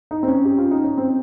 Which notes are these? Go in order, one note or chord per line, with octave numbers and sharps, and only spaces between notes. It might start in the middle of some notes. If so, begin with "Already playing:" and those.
D#4
C4
C#4
G4
F4
D#4
C#4
C4